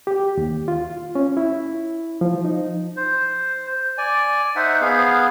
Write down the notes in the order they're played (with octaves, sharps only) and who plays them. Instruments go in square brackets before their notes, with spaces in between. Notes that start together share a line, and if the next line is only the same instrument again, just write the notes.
[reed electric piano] G4
D#2
F4
C#4
E4
F3
D#4
[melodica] C5
D5 G#5
D#4 C5 E5 F#5
B3 G#4 F5